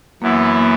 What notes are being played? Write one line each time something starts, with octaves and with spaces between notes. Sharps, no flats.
F#2 E3 A#3 B3 E4
A#3